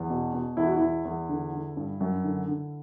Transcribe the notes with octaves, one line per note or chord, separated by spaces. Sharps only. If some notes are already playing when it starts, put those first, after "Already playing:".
Already playing: E2
B2
B2
E2 E4
F#4
E2 E4
E2
D3
D3
G2
F#2
D3
D3